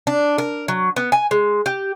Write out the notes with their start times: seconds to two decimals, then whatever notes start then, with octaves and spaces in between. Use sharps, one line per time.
0.07 D4
0.38 A#4
0.68 F#3
0.96 B3
1.12 G#5
1.31 G#3
1.66 G4